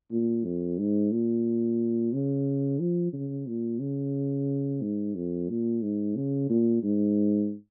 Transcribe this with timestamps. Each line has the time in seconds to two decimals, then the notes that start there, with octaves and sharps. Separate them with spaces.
0.11 A#2
0.45 F2
0.78 G#2
1.11 A#2
2.13 C#3
2.80 F3
3.13 C#3
3.48 A#2
3.80 C#3
4.81 G#2
5.15 F2
5.49 A#2
5.82 G#2
6.16 C#3
6.49 A#2
6.83 G#2